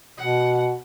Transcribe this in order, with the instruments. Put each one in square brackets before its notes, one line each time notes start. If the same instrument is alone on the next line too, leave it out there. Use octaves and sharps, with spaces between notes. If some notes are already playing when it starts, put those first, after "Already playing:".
[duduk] B2 [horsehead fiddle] F#5